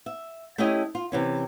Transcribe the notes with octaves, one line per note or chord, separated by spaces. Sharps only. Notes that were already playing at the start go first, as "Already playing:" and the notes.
E5
A3 C#4 E4 G4 D#5 G#5
F4
C3 E3 C#4